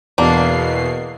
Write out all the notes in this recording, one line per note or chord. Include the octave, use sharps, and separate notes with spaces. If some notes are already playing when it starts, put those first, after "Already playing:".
E2 B2 A#3 D4 C7